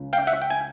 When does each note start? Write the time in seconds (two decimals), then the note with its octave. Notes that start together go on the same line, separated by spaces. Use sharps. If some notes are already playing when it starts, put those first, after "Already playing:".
Already playing: C#2 C#3
0.13 F5 G5
0.27 E5 F#5
0.42 G5
0.50 G#5